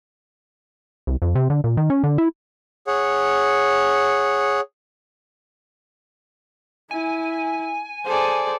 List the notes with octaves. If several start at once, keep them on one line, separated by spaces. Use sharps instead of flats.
C2
F2
C3
D3
A#2
D#3
C#4
D3
E4
G#4 C#5 F#5
E4 G#5
G#4 A4 C5 D5